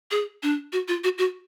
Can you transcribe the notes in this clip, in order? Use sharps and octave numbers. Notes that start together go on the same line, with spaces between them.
G#4
D4
F#4
F4
F#4
F#4